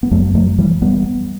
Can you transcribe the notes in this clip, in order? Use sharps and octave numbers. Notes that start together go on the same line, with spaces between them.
B3
F#2 F#3 A3
F#3 A3
E3 G3
G3 B3